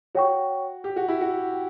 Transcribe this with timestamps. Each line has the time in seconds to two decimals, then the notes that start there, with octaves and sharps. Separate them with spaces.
0.15 F#4 C#5 G5 C#6
0.84 G4
0.96 F#4
1.08 E4
1.21 F#4
1.53 G5